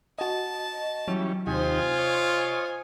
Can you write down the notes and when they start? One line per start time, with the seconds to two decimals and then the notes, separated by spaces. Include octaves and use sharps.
0.19 F#4 D#5 A5
1.08 E3 F#3 G3 C#4
1.47 D#2 C3 D#4 F4 G4 C5 G#5
1.98 C#5 D#5